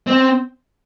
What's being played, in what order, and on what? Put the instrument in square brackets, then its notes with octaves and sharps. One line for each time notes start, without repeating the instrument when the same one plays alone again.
[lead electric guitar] C4